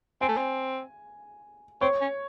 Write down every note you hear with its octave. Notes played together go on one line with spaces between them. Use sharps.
C4 G#5
A3
C4
C4 C#5
C#4